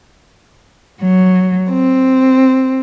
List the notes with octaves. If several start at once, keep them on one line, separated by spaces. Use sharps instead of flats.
F#3
C4